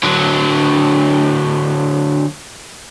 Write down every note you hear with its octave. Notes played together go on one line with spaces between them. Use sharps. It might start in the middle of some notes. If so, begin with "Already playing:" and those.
D3 F#3